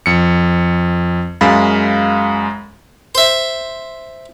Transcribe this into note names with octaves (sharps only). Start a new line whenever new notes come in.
F2 C#7
F#2 G#3 F5 B5 A6
C5 E5